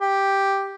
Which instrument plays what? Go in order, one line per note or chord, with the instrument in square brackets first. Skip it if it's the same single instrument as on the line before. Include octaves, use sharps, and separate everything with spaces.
[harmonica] G4